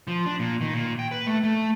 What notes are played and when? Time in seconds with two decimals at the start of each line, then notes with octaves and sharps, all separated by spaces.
0.08 F3
0.26 D4
0.39 A#2
0.61 D#3
0.73 A#2
0.99 G5
1.11 B4
1.27 A3
1.43 A3